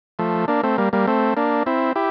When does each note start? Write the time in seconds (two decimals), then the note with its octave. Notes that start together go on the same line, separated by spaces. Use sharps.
0.19 F3 A3
0.48 A#3 D4
0.63 A3 C4
0.78 G3 A#3
0.93 G3 A#3
1.07 A3 C4
1.37 A#3 D4
1.66 C4 E4
1.96 E4 G4